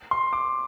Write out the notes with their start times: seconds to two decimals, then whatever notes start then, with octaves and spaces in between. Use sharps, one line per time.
0.11 C6
0.33 D6